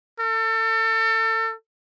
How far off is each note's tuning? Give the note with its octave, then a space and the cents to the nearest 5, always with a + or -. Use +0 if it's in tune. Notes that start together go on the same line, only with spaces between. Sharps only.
A4 +30